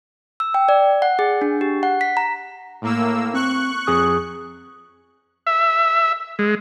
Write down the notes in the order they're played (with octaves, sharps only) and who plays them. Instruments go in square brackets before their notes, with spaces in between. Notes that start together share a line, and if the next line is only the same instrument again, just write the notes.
[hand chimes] E6
G5
D5
F#5
G#4
D4
G4
F#5
B6
A#5
[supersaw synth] A2 A#3 E6
[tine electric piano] C4 [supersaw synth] C#6 F#6
[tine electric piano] F2 G#4 D#6
[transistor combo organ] E5
G#3